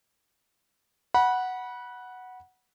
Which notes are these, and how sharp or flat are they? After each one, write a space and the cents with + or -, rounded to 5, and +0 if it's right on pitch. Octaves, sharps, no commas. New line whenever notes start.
F#5 +0 B5 -25